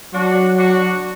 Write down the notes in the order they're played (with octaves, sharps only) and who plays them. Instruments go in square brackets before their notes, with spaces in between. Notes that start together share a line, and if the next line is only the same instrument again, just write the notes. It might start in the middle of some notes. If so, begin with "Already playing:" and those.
[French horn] F#3 [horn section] D4 F#4
[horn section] D4 F#4